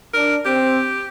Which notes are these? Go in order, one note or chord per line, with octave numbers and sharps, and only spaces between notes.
D4 A#4
C4 G4